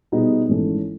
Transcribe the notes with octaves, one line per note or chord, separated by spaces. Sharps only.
B2 G3 B3 D#4 G#4
G#1 G#2 E3 A3 C#4